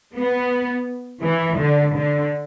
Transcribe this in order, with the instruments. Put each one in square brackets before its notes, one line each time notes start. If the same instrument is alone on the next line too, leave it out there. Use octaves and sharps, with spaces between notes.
[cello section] B3
E3
D3
D3